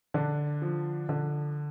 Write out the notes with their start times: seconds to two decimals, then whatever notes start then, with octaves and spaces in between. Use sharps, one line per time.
0.14 D3 D4
0.62 F3
1.09 D3